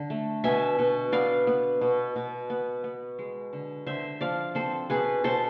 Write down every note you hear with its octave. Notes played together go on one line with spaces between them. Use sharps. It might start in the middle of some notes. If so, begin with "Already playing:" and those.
Already playing: D3
A3
B2 E5 G#5
B2
B3 D5 F5
B3
B2
B2
B3
B3
G#3
D3
D3 C5 E5
F3 D5 F5
C4 A4 C5
B2 G#4 B4
B2 A4 C5